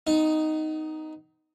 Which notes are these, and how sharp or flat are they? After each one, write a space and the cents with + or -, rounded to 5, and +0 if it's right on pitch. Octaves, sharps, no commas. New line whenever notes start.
B3 +35 D#4 +0